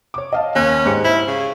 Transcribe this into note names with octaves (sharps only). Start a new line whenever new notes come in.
C#5 D6
D#5 F5 A5
D#2 C#4 G#5 F#6
G#2 G4 C#7
E4 C5
C#3